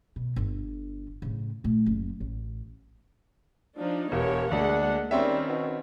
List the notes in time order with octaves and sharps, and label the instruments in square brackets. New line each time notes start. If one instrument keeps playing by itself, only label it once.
[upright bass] B2
G1 D3
A2 C#3
A#2 A3
F#1
A1
[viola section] F3 D4 D#4
[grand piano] E1 [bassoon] A#3 [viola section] B3 G4 C#5
[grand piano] D2 [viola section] G#3 A#3 F#5 [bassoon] D4
[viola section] D#3 [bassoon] G3 [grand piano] C4 C#4 E5
[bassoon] B2